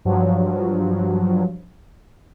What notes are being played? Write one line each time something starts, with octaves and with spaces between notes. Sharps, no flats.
G2 F3 F#3